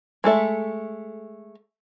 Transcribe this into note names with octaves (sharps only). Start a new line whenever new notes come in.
G#3 A3 A4 E5